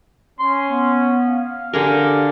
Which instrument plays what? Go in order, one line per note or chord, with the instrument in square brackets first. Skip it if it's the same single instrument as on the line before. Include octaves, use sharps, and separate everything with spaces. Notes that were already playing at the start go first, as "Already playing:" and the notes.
[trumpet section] C#4 [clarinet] C6
[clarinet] B3
[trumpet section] F5
[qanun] D3 G#4 A#4 [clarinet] G4